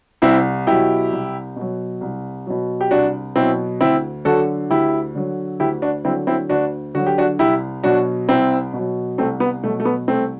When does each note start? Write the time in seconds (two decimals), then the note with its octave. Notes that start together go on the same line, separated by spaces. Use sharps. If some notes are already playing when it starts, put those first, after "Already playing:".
0.22 C2 C4 E4
0.67 B2 F#3 E4 G4
1.11 C2
1.56 B2 F#3
2.01 C2
2.47 B2 F#3
2.81 G4
2.91 C2 D4 F#4
3.36 B2 F#3 C4 E4
3.81 D2 C4 E4
4.25 D3 F#3 F#4 A4
4.70 D2 E4 G4
5.15 D3 F#3
5.60 D2 E4 G4
5.82 D4 F#4
6.04 D3 C4 E4
6.07 F#3
6.27 C4 E4
6.49 D2 D4 F#4
6.94 D3 F#3 F#4
7.07 G4
7.18 D4 F#4
7.39 C2 E4 G4
7.83 B2 F#3 D4 F#4
8.28 C2 C4 E4
8.73 B2 F#3
9.18 C2 A3 C4
9.40 B3
9.63 B2 A3
9.66 F#3
9.80 A3
9.85 B3
10.08 C2 A3 C4